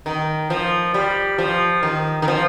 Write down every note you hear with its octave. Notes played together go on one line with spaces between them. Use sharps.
D#3
F3
G3
F3
D#3
D#3
F3